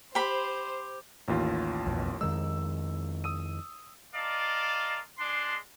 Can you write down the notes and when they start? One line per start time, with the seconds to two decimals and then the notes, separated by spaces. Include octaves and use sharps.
0.15 G4 C5 B5
1.28 A1 D#2 F4
1.86 B1 F2 B2
2.21 F2 D#3 G#3 E6
3.24 D#6 E6 D#7
4.15 F4 A#4 D5 D#5 F5 A5
5.19 G#3 D4 C6